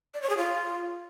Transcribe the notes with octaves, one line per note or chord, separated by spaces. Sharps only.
D5
C#5
G#4
F4